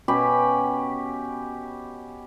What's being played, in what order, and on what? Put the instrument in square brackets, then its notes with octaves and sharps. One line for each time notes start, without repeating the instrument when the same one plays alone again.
[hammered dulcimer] B2 C#4 G4 B5